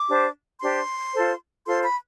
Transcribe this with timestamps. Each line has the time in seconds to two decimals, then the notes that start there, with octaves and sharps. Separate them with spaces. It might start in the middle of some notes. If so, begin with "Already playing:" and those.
Already playing: D6
0.08 D4 G4 C5
0.61 D4 G4 C5 C6
1.14 F4 A4 C5
1.66 F4 A4 C5 C6
1.84 B5